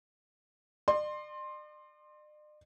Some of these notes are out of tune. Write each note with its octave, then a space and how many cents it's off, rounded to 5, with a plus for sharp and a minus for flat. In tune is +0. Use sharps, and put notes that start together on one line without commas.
D5 +45 C6 +10